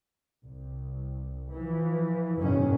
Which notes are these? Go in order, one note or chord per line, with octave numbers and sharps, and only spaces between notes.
C2
E3 F3
F#1 G#2 B2 D#3 F#3 C#4